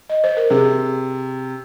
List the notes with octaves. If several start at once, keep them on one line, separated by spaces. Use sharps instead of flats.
D#5
C5
A#4
C3 G#4